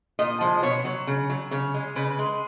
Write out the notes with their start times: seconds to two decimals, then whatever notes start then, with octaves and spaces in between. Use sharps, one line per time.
0.19 A#2 D#5
0.41 F3 G#3
0.62 B2 C#5
0.85 F#3
1.07 C#3
1.30 F#3
1.51 C#3 C#5
1.74 G#3
1.96 C#3 B4
2.19 G#3